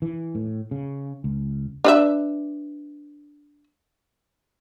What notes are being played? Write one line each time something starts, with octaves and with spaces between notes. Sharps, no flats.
E3
A2
C#3
C#2
D4 B4 E5